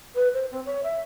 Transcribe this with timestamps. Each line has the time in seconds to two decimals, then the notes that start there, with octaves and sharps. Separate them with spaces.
0.15 B4
0.33 C5
0.51 C4
0.66 C#5
0.83 E5